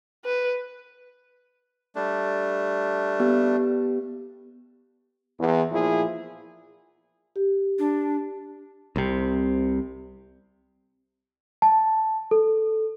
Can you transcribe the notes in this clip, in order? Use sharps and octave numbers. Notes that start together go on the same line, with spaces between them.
B4
G3 A3 D4
B3 G4
E2
A#2 F3 E4 G#4
G4
D4
C2 C3
A5
A4